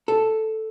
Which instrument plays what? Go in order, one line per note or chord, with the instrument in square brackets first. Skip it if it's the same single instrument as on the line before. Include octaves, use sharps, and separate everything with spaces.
[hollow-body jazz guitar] A4